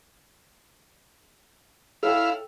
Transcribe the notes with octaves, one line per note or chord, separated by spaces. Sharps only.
E4 A4 C#5 F5 G5